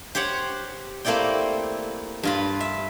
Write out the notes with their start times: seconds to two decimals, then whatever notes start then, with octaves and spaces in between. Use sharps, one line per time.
0.15 G4 C5 C#5 F#5
1.05 A3 A#3 C4 E4 D5 G5
2.23 G2 F4 B4
2.60 E5